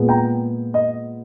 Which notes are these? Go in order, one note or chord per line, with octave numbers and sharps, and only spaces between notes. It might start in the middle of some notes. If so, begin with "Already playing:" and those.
Already playing: A#2 G#3 B3
G5 A#5
D#5